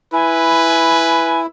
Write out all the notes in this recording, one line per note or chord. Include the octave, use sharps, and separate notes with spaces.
E4 B4 G#5